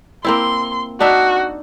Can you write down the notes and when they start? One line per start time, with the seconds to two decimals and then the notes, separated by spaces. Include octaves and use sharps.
0.25 A#3 C4 E4 C6
1.00 D4 D#4 F#4 E5